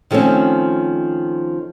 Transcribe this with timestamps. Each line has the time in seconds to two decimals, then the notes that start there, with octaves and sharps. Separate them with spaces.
0.11 D#3 F3 A3 C4 C#4